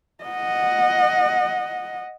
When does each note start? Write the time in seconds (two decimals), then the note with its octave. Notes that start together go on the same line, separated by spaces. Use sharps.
0.24 D#5 F#5